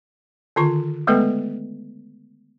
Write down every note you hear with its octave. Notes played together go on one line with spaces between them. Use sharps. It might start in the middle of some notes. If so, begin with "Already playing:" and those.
D3 D#3 F4 C#6
G#3 A3 B3 A4 B4 G5